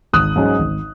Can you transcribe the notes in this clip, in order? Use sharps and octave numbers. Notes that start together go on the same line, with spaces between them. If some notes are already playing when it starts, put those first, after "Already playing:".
G#1 D#6 F#6
G#2 F#3 C#4
G#1